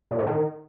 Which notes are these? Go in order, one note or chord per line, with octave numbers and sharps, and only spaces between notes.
A#2
A2
D#3